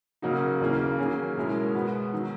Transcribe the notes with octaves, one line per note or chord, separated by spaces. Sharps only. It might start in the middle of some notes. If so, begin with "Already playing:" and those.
C#3 F#3 A#3 D#4 F#4
D#2 C#3 E3 A#3
D#3 F#3 A#3 C#4 G#4
B2 G#3 C#4 E4 A#4
B2 G#3 B3 F#4
D#3 F#3